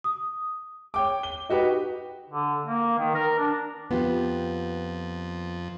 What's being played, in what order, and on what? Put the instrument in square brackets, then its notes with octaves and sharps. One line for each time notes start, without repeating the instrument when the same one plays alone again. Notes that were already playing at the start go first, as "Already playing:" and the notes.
[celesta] D#6
[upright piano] C#5 G5 D6
G7
D#4 F#4 G4 B4
[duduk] D3
A#3
D#3
A#4
D4
[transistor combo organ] F2 [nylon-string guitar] B3 F4 G4